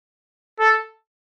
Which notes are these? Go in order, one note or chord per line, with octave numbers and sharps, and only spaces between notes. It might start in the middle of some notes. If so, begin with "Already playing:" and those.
A4